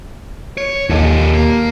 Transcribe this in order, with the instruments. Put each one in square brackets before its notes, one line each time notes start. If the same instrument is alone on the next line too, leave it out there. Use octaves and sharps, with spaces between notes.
[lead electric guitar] C#5
[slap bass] D#2 [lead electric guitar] A#2 A4
[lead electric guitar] A#3